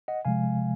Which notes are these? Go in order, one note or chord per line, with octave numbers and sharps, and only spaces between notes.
D#5 F#5
C3 F3 G#3 F5 G#5